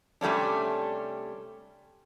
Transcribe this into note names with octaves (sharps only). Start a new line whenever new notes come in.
C3 G3 A3 C#4 D4